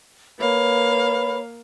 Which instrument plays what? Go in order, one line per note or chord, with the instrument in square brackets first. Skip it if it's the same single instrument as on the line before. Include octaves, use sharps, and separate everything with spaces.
[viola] A#3 F5 [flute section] B4 C#5 B5